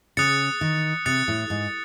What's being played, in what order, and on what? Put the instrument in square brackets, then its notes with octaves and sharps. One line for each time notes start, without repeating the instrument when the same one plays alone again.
[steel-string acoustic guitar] C#3 [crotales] D#6 F#6 A6 C#7
[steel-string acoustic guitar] D#3
[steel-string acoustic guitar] C3 [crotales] D#6 F#6 A6 C#7
[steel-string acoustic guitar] A2
G#2